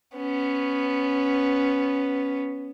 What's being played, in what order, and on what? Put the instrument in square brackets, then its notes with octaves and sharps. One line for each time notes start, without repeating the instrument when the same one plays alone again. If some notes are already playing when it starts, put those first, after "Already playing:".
[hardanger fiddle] B3 C#4